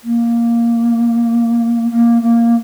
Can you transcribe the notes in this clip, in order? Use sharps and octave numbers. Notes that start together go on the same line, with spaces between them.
A#3
A#3
A#3